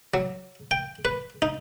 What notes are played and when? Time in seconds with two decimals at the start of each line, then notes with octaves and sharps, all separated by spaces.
0.14 F#3
0.71 G5
1.05 B4
1.42 D#4